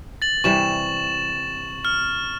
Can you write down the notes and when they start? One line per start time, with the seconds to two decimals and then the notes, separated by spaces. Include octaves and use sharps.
0.22 A6 F#7
0.44 C3 E3 G3 C#6 E7
1.85 F6